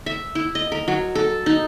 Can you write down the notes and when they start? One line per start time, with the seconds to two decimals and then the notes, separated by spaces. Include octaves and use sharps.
0.06 E5
0.35 E4
0.55 D#5
0.72 A#4
0.88 F#3
1.15 A4
1.46 D#4